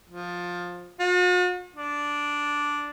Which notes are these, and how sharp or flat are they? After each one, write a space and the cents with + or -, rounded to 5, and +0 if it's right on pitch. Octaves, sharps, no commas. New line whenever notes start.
F3 +15
F#4 -45
D4 -5